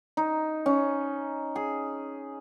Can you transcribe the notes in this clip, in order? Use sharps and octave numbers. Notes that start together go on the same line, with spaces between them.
D#4
C#4
G#4